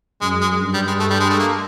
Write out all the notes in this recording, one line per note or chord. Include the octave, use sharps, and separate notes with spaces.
F#2 G#3
G#3
G2
G3
G#3
A3
G3
G#3
A3
A#3